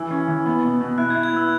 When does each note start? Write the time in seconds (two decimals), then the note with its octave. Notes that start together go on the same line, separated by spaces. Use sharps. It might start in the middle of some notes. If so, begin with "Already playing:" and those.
Already playing: E3 E6
0.11 C#4
0.28 E3
0.46 B3
0.63 B2
0.80 B2
0.98 E4 F#6
1.10 G#6
1.15 E4
1.23 G#6
1.33 B3 E6